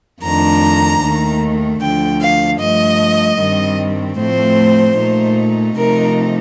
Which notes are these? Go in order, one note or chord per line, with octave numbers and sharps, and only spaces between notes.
F2 D#3 A3 D4 A#5
D#2 D#3 A3
D2 D3 F3 G5
F5
G2 F3 A3 D#5
G2 D#3 G3 C4
A2 F3 A3 C4 C5
A#2 A3 D#4
C3 F3 A3 D#4 A#4